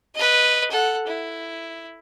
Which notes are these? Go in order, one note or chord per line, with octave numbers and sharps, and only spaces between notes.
B4 D#5
A4 F#5
E4